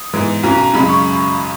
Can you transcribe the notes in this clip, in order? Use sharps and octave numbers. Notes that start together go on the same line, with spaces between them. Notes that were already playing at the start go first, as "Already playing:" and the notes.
Already playing: D#6
G#2 E3 G#3 B3
B1 B2 F#3 C#4 A#5
A#5
F#2 C#3 G#3 B5
C#6